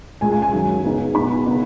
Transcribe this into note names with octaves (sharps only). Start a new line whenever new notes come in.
C#2 C#3 G#3 G#5
G#5
G#5
F#2 D#3 F#3
C#3 B3 D#4
B2 G#3 B3 D#4 B5
C#3 B3 D#4